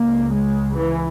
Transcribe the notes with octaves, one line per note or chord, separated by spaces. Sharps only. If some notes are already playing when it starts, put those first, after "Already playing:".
Already playing: C#2 C#3 A#3
G#3
E3